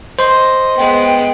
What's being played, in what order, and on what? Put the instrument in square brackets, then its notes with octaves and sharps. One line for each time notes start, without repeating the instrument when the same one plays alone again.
[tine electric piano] C5 C6 [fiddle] D#5
[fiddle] G#3 B3 [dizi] G5